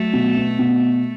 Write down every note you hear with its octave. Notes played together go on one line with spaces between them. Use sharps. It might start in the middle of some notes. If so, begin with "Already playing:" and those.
Already playing: F#3 A3
B2
B3
B2